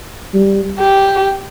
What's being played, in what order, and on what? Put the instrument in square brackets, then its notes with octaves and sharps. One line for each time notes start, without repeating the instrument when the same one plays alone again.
[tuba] G3
[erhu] G4